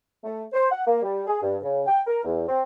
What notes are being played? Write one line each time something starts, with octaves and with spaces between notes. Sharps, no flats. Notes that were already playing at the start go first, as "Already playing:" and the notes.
A3
C5
F#5
A#3
G3
G#4
G2
C#3
G5
A#4
E2
C4